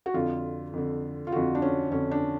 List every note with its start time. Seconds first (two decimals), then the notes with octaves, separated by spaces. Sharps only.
0.06 F#4
0.14 F2 D3 F4
0.73 F2 D3
1.27 F4
1.32 F2 D3 F#4
1.55 D4
1.62 C#4
1.91 F2 D3 C#4
2.11 D4